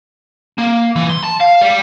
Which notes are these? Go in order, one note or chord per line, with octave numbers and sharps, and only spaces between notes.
A#3
E3
C6
A5
F5
G3